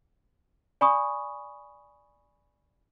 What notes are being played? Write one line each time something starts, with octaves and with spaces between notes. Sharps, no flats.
D5 G#5 B5 C#6 D#6